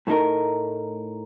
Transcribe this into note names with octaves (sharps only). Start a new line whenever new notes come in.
A2 A3 D#4 A#4